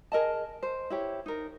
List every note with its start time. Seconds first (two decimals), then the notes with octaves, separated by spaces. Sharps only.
0.12 G#4 A#4 D#5 A5
0.63 C5
0.90 E4 G4 C#5
1.26 D#4 A#4